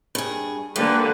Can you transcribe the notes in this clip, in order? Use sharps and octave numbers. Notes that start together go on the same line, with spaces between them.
G2 G#4
D3 A#3 G4 B4